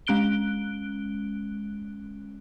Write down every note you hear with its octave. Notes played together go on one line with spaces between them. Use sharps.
G#3 C#4 F#6 D7 G7